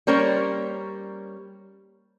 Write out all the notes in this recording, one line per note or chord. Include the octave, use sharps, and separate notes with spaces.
G3 A#3 C#4 A#4 C5 C#5